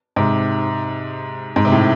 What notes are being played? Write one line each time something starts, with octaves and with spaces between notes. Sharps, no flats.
G#2 C3
G#2
C3
A2